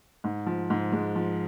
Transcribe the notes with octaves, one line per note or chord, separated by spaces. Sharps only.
G#2
F3
G#2
G#3
F3